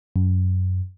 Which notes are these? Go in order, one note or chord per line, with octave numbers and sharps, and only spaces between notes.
F#2